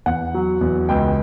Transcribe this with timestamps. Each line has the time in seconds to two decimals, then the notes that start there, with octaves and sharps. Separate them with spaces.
0.06 E2 F#5
0.34 F#3
0.61 E2
0.89 C#2 G5